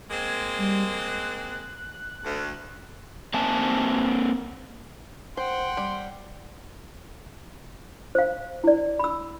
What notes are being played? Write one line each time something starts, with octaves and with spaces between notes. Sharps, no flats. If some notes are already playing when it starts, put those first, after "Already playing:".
G#3 A#3 C4 G#6
G3
F#6
D2
A#3 C4 E5 G#5 A5
C5 F#5 G5 C6
G3
C5 F5
E4 D5
B5 E6